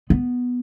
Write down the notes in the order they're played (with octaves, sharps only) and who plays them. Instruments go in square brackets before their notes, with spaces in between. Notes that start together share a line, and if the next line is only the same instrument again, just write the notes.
[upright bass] B3